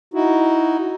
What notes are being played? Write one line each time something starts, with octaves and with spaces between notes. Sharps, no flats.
D#4 E4 F#4